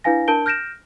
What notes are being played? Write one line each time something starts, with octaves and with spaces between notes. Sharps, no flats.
D4 E4 B4 F5 G#5 A#6
D4 A#4 A5 G6 D7 G7
F6 G6 A#6 D7 E7